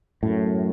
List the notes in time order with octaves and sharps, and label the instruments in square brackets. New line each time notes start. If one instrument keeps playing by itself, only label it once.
[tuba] F#2 [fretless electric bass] A2